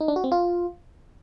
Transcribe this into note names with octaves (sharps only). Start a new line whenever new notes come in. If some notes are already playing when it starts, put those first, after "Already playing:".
D#4
D4
F#4
C4
F4